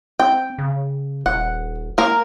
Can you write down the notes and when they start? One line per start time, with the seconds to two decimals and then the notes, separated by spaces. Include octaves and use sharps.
0.20 C4 G5
0.58 C#3
1.26 D#1 F#5
1.98 A#3 A#4